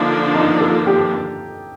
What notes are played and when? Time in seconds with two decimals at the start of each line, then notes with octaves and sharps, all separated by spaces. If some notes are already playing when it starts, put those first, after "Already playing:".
Already playing: D3 F3 A#3 D4 D#4
0.35 D#4
0.61 A4
0.87 G4